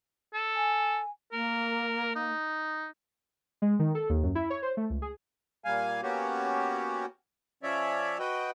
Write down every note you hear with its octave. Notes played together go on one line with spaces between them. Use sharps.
A4
G#5
A#3 A#4
D#4
G#3
D#3
A4
D#2
F#2
E4
C#5
C5
A3
C#2
G#4
A#2 G3 A#3 F5 G#5
A#3 B3 C#4 F#4 G4
F3 C#4 C#5 D5 E5
F#4 B4 D#5 G5